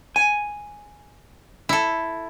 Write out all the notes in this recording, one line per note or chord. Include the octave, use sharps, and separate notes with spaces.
G#5
E4 A4